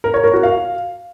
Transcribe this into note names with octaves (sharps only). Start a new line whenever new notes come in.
A#4
C#5
A#4
F#4
F5